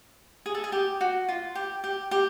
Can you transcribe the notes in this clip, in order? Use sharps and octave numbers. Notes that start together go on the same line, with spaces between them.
G#4
A4
G#4
G4
F#4
F4
G4
G4
G4